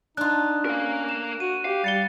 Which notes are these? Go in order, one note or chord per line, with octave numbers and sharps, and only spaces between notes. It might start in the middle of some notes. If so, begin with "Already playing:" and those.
D4 D#4 F4 F#6
C#4 A#4 F5
E7
F#4 D#7
G4 F5
G3 A6 C#7 G7